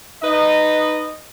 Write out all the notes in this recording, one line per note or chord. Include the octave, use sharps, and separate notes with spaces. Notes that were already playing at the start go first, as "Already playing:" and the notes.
D#4 B4 D#5